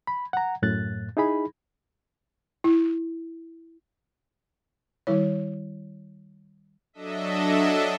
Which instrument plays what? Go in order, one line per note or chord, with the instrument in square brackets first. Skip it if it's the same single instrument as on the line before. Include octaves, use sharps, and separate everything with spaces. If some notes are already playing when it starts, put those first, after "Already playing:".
[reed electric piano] B5
F#5 A#5
F#2 A2 F#6 A6
D#4 E4 G#4 B5
[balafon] E4
D#3 G3 E4 C#5
[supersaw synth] F#3 D4 A4 D#5 E5